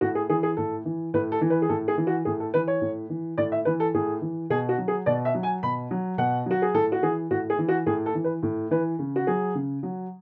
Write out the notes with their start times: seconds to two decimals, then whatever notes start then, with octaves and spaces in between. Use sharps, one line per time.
0.01 A2 F#4
0.15 G#4
0.29 E3 G#4
0.43 G#4
0.57 A2 A4
0.85 E3
1.14 A2 B4
1.32 A4
1.41 E3
1.50 B4
1.62 G#4
1.69 A2 A4
1.88 G#4
1.97 E3
2.07 F#4
2.25 A2 G#4
2.40 A4
2.54 E3 B4
2.68 C#5
2.81 A2
3.10 E3
3.38 A2 D5
3.52 E5
3.65 E3 B4
3.80 A4
3.94 A2 G#4
4.22 E3
4.50 B2 G#4
4.69 F#4
4.78 F#3
4.88 G#4
5.06 B2 D5
5.25 E5
5.34 F#3
5.43 G#5
5.63 B2 B5
5.91 F#3
6.18 B2 F#5
6.46 F#3 F#4
6.62 G#4
6.74 A2 A4
6.92 F#4
7.02 E3 G#4
7.31 A2 F#4
7.50 G#4
7.58 E3
7.68 F#4
7.86 A2 G#4
8.06 A4
8.15 E3
8.24 B4
8.43 A2
8.71 E3 B4
8.99 C#3
9.16 F#4
9.27 F#3 G#4
9.55 C#3
9.83 F#3